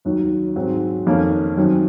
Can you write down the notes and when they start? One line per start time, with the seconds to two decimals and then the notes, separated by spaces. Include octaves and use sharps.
0.05 D#2 D#3 F#3
0.56 G#2 F#3 C4
1.07 F2 D#3 A#3 C#4
1.57 F#2 D#3 F#3 C4